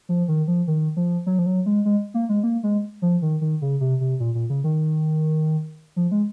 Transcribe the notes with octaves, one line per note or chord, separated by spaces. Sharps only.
F3
D#3
F3
D#3
F3
F#3
F3
F#3
G#3
G#3
A#3
G#3
A#3
G#3
F3
D#3
D#3
C#3
C3
C3
A#2
A#2
C#3
D#3
F3
G#3